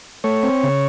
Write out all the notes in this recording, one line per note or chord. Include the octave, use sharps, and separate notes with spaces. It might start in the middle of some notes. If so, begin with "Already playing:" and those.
A3 C#5
C4
C#3